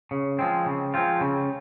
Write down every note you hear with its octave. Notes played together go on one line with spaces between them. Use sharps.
C#3
F3 G#3 C4
C#3
F3 G#3 C4 F4
C#3